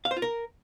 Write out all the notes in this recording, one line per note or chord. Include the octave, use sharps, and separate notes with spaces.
F5
C5
F4
A#4